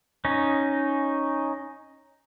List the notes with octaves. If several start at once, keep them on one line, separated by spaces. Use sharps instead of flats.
C#4 D#4